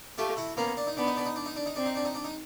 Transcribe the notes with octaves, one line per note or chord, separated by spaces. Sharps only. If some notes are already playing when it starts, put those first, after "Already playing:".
A3 F4 G4
E4 F#4
A#3 B3 C#4
D4
D#4
B3 D4
D#4
D4
D#4
D4
D#4
D4
D#4
C4 D4
D#4
D4
D#4
D4
D#4